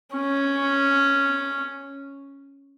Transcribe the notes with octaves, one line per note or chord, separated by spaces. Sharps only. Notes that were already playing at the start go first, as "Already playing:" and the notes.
C#4